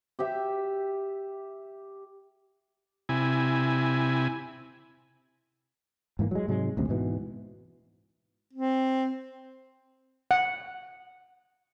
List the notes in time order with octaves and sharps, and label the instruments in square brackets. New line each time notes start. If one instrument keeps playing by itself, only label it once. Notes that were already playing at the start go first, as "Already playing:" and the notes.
[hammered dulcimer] G4 E5 G5
[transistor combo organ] C3 E4 G#5
[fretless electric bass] G#2 E3 A3 A#3
F#3 G#3
G#2 C3 F#3 G#3
A1 D2 C3
G#2 B2 E3
[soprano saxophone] C4
[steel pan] F#5